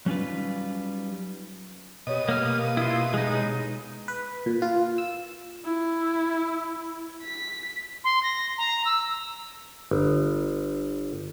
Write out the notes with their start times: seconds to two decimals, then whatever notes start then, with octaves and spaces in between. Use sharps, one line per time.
0.06 F#3 G3 C#4 D#4 F4 B4
2.07 B2 G4 C#5 D#5 D#6
2.29 A#3 F6
2.77 E4 F4
3.14 G#3 D#4
4.08 B4
4.46 A#2
4.62 F4
4.98 E6
5.65 E4
7.23 B6
8.04 C6
8.23 A#6
8.58 A#5
8.85 E6
9.91 G1